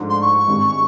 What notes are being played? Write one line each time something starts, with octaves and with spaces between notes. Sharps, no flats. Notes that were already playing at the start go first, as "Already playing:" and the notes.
Already playing: G#2 F3 A3 D4
C6
C#6
G2 D#3 G#3 C4